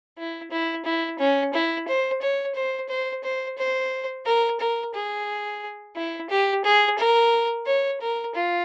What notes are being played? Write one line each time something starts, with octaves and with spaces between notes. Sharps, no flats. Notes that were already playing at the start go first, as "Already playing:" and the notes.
E4
E4
E4
C#4
E4
C5
C#5
C5
C5
C5
C5
A#4
A#4
G#4
E4
G4
G#4
A#4
C#5
A#4
F4